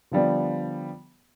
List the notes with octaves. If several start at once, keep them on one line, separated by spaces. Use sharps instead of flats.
D3 F3 G3 B3